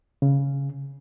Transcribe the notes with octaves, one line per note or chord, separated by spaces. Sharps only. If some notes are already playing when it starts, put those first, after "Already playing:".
C#3